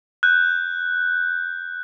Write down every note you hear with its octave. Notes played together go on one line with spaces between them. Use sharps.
F#6 G6